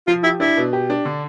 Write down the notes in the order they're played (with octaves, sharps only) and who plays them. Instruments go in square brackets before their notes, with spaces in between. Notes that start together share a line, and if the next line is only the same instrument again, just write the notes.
[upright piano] F3 [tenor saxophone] F4
[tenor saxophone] E4 [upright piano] G4
[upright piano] D4 [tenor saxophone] E4
[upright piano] B2
G4
D4
D3